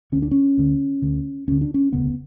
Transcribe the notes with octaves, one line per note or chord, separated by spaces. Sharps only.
D2 D3 C#4
D4
C#4
D2 D3
D2 D3
D2 D3 C#4
D4
C#4
E1 D2 C#3 B3